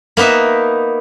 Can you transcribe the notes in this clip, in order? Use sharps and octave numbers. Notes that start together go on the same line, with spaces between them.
A#3 B3 D#4 B4 E5